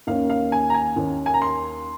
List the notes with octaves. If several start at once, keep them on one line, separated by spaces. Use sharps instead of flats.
D#2 D#3 A#3 C#4 F5
F5
G#5
A#5
G#5
D#2 D#3 A#3 C#4
G#5
A#5
C6